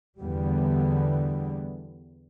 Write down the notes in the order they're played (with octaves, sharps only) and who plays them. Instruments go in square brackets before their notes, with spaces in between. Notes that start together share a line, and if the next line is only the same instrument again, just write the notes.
[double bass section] E2 D3 G3 B3